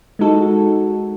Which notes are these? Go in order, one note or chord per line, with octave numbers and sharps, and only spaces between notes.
G#3 D#4 F#4 A4